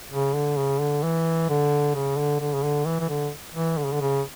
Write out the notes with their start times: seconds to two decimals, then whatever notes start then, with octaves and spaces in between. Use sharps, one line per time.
0.12 C#3
0.34 D3
0.57 C#3
0.80 D3
1.03 E3
1.49 D3
1.95 C#3
2.17 D3
2.41 D3
2.54 C#3
2.64 D3
2.86 E3
3.00 E3
3.09 D3
3.55 E3
3.78 D3
3.85 C#3
3.93 D3
4.01 C#3